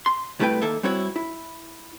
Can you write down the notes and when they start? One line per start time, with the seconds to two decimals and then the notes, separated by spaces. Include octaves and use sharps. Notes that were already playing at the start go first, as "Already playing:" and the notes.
0.06 C6
0.39 C2 G3 A3 E4 B4 G5
0.62 D#3 A#3 A4 E5
0.83 G3 C4 E4 F#4 C#5
1.16 E4